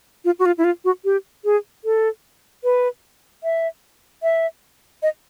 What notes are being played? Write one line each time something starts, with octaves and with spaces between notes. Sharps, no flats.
F4
F#4
F4
E4
F4
F#4
G4
G#4
A4
B4
E5
E5
D#5